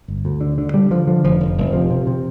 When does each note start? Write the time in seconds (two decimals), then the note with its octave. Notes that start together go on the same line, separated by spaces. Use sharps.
0.08 G1
0.25 D2
0.41 D3
0.58 D3
0.74 D3 G3
0.91 D3 F3
1.07 D3 F3
1.24 F1 F3
1.40 F1
1.58 F1
1.73 C3 F3
1.90 C3
2.07 C3